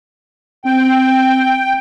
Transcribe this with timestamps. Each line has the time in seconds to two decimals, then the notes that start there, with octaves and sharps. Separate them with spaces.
0.65 C4 G5